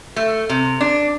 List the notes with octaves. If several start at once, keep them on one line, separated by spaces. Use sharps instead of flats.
A3
C3
D4